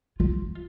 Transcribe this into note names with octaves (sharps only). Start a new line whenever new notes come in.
F4